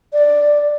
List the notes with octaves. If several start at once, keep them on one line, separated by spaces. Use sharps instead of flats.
D5